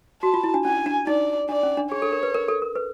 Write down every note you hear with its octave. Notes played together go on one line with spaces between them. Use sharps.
F#4 A5
F4
E4
D4
C#4 G#5
D4
D#4 D5
D4 D5
C#4
D4
G#4 C#5
A4
A#4
B4
A#4
A4
A#4
B4